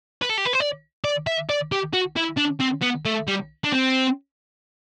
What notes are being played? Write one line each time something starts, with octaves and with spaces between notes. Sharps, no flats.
B4
A4
G4
B4
C5
D5
D5
E5
D5
G4
F#4
E4
D4
C4
B3
A3
G3
D4
C4